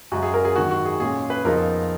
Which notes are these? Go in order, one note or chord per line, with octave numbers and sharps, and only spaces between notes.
F#2 C#3 G#3 F#4
G#4
A#4
G#4
G#2 D#3 F#3 F#4
F#4
G#4
A#2 G#3 C#4 G#4
B4
F2 C#3 F3 B3 D#4 A#4